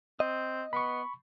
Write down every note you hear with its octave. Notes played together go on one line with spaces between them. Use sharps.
C4 D#5
B3 B5 C#6